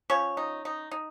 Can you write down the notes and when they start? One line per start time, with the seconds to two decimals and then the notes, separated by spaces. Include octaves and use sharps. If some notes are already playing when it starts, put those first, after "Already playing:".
0.10 F3 C#4 C#5
0.37 D#4
0.65 D#4
0.91 D#4